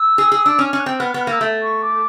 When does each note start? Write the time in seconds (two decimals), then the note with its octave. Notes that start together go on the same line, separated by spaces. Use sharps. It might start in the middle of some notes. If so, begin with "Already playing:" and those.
Already playing: E6
0.18 G#4
0.32 G#4
0.46 D4
0.59 C#4 F6
0.73 C#4
0.80 F#6
0.86 C4
1.00 B3 F6
1.10 B3 F#6
1.21 F6
1.27 A#3 E6
1.41 A3
1.62 C#6
1.82 D6